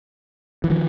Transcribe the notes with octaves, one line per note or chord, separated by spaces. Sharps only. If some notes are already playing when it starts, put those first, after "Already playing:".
E3
D#3 F3